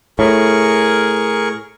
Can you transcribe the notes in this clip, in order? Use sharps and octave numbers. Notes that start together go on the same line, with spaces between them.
A2 G#4 A#4 C#6